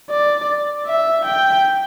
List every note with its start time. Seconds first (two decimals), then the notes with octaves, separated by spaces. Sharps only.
0.10 D5
0.86 E5
1.25 G5